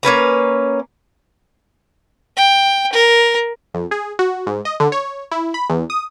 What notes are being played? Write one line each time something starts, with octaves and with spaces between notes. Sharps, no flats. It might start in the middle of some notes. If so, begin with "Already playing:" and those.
A#3 C#4 B4 A#5
G5
A#4
F2
G#4
F#4
G#2
D#5
D3
C#5
E4
B5
E2
D#6